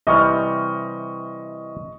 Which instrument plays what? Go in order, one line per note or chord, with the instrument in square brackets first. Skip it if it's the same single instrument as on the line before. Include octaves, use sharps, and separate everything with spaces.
[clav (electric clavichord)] C3 E3 G3 [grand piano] D#5 C#6 F6